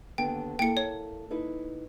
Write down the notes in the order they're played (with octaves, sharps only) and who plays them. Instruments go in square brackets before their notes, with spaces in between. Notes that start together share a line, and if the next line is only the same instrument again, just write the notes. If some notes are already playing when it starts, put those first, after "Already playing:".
[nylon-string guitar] D#2 D3 B3 [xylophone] G5
[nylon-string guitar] A#3 E4 A4 [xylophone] G5 C#7
[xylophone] C#5
[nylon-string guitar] D#4 E4 B4